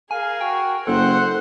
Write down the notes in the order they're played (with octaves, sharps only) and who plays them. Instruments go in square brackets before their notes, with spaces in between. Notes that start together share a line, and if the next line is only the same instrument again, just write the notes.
[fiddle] G#4 A#4 [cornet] F5 [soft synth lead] G#5
[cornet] F#4 [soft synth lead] G5
[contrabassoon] F#1 [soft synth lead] A4 [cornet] C5 [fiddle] F#5